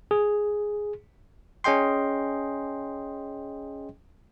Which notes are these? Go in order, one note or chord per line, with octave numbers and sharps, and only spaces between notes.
G#4
C#4 G#4 D#5 G5 C6